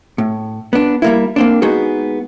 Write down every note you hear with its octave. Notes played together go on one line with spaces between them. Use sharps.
A2
B3 D4
G3 A#3 E4
A#3 C4 D4
G#3 B3 D#4 F#4 G#4